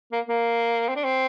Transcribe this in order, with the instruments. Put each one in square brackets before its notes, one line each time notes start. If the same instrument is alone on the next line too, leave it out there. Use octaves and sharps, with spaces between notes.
[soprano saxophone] A#3
A#3
C4
D4
C4